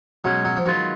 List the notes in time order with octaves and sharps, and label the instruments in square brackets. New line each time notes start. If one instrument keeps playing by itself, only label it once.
[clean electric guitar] B1 B2 G#3 C#4 [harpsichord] F#3
[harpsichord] F#3
F3
[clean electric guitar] D#3 G#3 B3 F4 [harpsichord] F#3